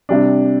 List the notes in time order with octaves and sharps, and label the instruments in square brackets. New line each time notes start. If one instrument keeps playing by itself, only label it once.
[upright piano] C3 G3 D4